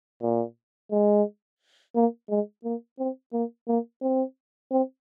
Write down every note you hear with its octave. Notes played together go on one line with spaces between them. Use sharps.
A#2
G#3
A#3
G#3
A#3
C4
A#3
A#3
C4
C4